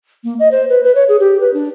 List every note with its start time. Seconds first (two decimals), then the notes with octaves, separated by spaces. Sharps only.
0.24 A#3
0.40 D#5
0.51 C5
0.69 B4
0.84 B4
0.95 C#5
1.09 G#4
1.20 G4
1.41 B4
1.54 D4